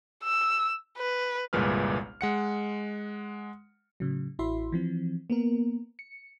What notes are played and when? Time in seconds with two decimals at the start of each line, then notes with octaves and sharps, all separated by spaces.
0.24 E6
0.98 B4
1.53 G1 C2 A#2 G#3 B4 F6
2.21 G#3 F#5 C#7
4.00 A2 C#3 F#3
4.39 A1 E4 F#4 E5 B5 C6
4.72 E3 F3 C4
5.30 A#3 B3 A#4
5.99 C#7